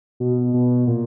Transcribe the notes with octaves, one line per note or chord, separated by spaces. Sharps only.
B2
B2
A#2